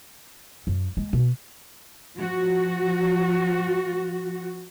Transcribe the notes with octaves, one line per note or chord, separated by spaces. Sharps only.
F#2
G#3
B2
F3 F#4